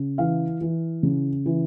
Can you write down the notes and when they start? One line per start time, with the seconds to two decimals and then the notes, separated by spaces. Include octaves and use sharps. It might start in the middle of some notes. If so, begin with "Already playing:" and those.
Already playing: C#3
0.18 E3 F5
0.61 E3
1.03 C#3
1.46 E3